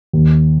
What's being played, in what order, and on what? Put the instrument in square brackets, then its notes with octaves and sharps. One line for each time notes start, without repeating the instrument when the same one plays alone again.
[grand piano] D#2